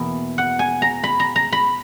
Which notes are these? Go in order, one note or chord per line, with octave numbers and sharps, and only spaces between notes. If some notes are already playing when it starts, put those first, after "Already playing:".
Already playing: E2 B2 A#3 E4
F#5
G#5
A#5
B5
A#5
A#5
B5